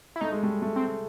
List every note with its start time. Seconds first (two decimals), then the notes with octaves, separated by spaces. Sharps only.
0.16 E4
0.21 A3 D#4
0.32 G#3
0.43 G3 A3
0.62 G3 A3
0.76 C4